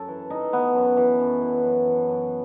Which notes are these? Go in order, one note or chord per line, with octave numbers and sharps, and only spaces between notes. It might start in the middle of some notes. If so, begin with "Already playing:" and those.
Already playing: F#2 A4
E3
E3 D#4
E3 B3
F#2
E3
F#2
E3
F#2
E3
F#2